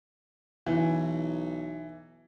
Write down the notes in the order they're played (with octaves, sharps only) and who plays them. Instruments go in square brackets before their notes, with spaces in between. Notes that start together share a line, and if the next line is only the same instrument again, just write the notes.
[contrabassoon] B1 [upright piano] E3